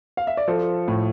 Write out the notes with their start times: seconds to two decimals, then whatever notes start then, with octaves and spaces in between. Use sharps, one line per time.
0.17 F5
0.27 E5
0.37 D5
0.48 F3 A4 C5
0.88 A2